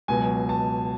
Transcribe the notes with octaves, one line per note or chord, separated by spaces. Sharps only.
C#2 B2 F#3 G#5
A5